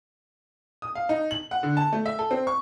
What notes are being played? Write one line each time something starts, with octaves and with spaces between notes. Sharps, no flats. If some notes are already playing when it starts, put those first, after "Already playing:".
D#6
F5
D#4
F#7
F#5
D3
A5
A3
E5
A4
C4
C#6